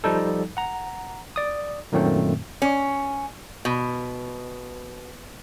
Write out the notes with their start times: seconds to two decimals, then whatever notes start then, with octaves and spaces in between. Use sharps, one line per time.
0.04 F3 G3 D#4 A4
0.57 F#5 A#5
1.36 D5 D#6
1.92 F#2 A#2 D#3 F#3 A3 C4
2.62 C#4
3.65 B2